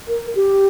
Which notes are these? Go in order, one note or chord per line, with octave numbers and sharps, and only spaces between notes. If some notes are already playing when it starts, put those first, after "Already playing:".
A#4
G4